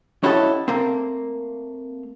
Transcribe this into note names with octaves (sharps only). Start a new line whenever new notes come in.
C#4 E4 F#4 G4 A4 D#5
A3 A#3 C4